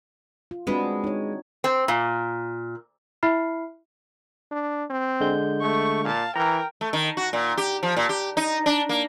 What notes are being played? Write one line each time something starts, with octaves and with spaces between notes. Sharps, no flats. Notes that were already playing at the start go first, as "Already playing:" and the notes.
F4
G#3 B3 C4 D4 F#4
D#4 C#5
C4
A#2
E4 E5 B5 F6 C7
D4
C4
D3 G#3 G6
A3 C#6
A#2 F5 A5
E3 A#4 G5 A#5
A3
D#3
F#4
A#2
G4
F3
A#2
G4
D#4
D4
A#3